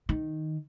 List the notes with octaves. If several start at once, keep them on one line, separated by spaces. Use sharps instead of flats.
D#3